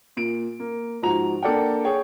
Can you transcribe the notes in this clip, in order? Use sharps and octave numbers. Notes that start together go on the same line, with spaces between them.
A#2 D7
A#3
G#2 F3 F#4 A#5 F7
A#3 D4 A4 D5 F#5 G5
G#4 C#5 G5